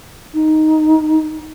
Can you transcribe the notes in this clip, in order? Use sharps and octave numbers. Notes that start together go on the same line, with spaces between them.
D#4